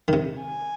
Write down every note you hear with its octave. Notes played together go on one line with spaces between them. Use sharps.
D#3
C3
G#5